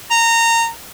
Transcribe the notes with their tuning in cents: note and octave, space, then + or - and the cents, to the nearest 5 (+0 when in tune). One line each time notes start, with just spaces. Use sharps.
A#5 -20